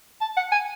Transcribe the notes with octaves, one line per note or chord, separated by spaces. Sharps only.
A5
F#5
G#5